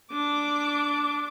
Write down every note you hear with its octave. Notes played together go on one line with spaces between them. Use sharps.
D4 D6